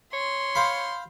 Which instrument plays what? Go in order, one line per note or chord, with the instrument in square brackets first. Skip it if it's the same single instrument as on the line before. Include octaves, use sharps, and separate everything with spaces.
[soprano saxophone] C#5 [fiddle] C6
[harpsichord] C5 F5 B5